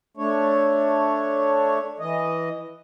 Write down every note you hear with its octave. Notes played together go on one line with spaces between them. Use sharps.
A3 D4 C#5
E3 D#5